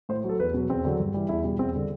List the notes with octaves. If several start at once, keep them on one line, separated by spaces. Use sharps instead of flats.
A2 C5
F#3 A4
E2 B4
B2 F#3
E2 C4
D3 F#3
G2
E3 G3
E2 E4
B2 G3
E2 C4
D3 G3